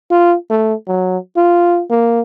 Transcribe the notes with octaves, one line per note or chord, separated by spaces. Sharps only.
F4
A3
F#3
F4
A#3